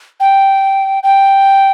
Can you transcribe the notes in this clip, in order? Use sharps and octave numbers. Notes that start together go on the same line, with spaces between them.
G5
G5